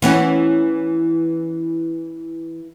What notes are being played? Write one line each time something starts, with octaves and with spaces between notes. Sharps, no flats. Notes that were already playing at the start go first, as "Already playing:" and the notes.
E3 B3 C#4